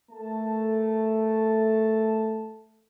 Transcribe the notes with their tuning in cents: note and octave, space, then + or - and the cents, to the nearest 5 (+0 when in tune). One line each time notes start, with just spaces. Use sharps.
A3 +0 A#4 +0 A5 +0